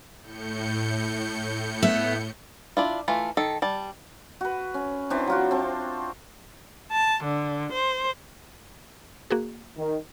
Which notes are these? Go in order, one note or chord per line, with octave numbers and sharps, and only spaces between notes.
A2 G6 C#7
B3 E5
D4 E4 F4
E3 A3 F4
D#3 A4
G3 A5
F#4 B4
C#4
E3 C4 D4
F#3 F4 F#4
C4 A5
A5
D3
C5
A#3 F#4 G#4
D#3